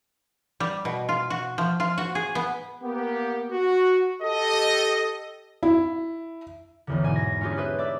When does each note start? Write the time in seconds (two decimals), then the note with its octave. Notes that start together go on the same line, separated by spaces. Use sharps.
0.60 G3
0.85 B2
1.09 F4
1.30 F#4
1.58 F3
1.80 F4
1.98 F#4
2.15 G#4
2.35 B3
2.83 A#3 B3 G4
3.52 F#4
4.22 G4 A4 D#5
5.63 E4
6.87 A1 E2 D3
7.03 G#2 B2 G#5
7.16 A#6
7.41 C#4 D4 F4 G4 G#4
7.57 G4 G#4 B4 C5 E5 F#6
7.78 B4 D5 E5 D6 E6